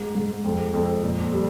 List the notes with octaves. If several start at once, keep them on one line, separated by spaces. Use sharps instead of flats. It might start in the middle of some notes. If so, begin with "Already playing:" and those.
Already playing: G#2
G#2
F2
F2
A#2
G3